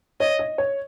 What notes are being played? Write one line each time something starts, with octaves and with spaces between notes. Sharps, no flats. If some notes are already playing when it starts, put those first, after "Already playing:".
C#5 D#5
D#5
C#5